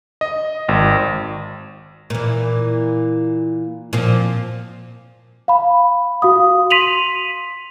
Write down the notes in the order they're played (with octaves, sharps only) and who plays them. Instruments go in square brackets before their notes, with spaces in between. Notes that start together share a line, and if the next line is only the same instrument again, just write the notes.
[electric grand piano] D#5
G#1
[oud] A#2 E3
A#2 F3 C4
[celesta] F5 B5
F#4 F5 D#6
C6 B6 D#7 F7 F#7